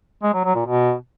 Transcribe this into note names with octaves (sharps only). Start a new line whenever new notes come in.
G#3
F#3
F#3
A#2
B2